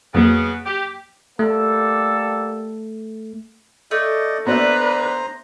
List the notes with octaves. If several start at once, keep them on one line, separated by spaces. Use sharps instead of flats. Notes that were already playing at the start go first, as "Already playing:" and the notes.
F2 C#3 F#3 A#3 B3
G4
G3 A3 A#3 A4
A3 D5 D#5
B3 D4 B4 C5 D5 E5 A#5